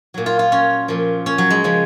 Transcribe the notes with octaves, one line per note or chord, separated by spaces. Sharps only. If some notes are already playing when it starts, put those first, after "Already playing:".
A#2 F#3
F4
F4
C#4
A#2 F3
C#4
F#3
G#3
C#3 F3